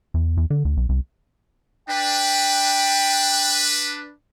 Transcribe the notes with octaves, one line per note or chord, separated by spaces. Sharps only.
E2
E2
D3
D2
B1
C2
D4 B4 G5